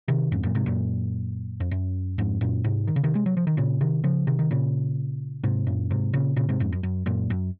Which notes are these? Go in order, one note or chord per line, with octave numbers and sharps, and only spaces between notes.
C3 D#3
F2 G#2
F#2 A#2
G#2 C3
F#2 A#2
F2
F#2
F2 G#2
F#2 A#2
G#2 C3
D#3
C#3
C3 D#3
G#3
F#3
F3
D#3
A#2 C#3
C3 D#3
C#3 F3
C3 D#3
D#3
A#2 C#3
G#2 C3
F#2 A#2
G#2 C3
A#2 C#3
A#2 C#3
G#2 C3
F2 G#2
F#2
F#2
F#2 A#2
F#2